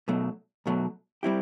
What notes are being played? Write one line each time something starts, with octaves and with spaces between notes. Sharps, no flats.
B1 B2 F#3 A3
B1 B2 F#3 A3
G3 C4 E4 G4